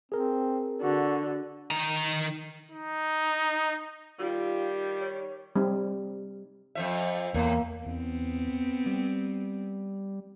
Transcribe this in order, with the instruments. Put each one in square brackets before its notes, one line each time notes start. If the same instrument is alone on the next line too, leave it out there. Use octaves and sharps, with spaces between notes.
[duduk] C4 [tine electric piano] G#4 A#4
[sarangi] D3 [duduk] F#4
[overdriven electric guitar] D#3 A#5
[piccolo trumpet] D#4
[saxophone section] D#3 G3 [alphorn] F4
[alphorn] C#5
[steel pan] G3 C4 D#4
[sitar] F2 F3 E5
[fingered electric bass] E2 [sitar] A2 [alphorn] A#3
[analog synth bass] E2 [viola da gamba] B3 C4
[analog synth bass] G3